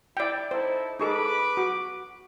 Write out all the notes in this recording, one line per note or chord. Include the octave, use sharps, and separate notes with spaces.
E4 D5 G5
D#4 E4 A4 C5
D#4 G#4 A4 B4 B5 D6
F#4